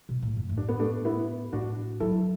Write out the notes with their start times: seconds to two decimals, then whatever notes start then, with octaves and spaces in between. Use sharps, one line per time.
0.09 B2
0.22 A2
0.36 F#2
0.49 A2
0.57 D4
0.68 B3
0.80 A3 D4
1.05 B3 E4
1.53 A2 D4 F#4
2.00 F#3 E4 A4